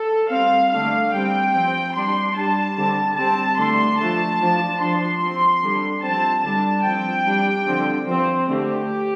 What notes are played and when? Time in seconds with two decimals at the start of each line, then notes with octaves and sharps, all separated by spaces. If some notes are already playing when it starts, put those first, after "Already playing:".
Already playing: A4
0.30 G3 C4 F5
0.71 D3 A3 D4 F5
1.13 G3 C4 G5
1.54 F3 C4
1.95 G3 D4 C6
2.35 G3 D4 A5
2.77 D3 G3 C4
3.17 G3 C4 A5
3.58 D3 A3 D4 C6
3.98 F3 A3 D4 A5
4.40 F3 D4
4.80 F3 D4 C6
5.22 F3 C4
5.63 D3 G3 D4
6.03 F3 C4 A5
6.44 D3 G3 D4 A5
6.85 F3 C4 G5
7.26 G3 D4
7.67 D3 F3 C4
8.07 F3 C4 C5
8.48 D3 A3 C4 G4